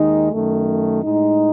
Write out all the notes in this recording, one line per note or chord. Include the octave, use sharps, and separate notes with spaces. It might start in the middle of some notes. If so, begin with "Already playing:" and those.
Already playing: D#2 D#3 G#3 D#4
F#2 D#3 A3
A2 G#3 D#4